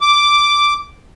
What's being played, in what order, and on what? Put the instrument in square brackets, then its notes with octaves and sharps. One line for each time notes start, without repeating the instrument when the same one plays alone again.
[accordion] D6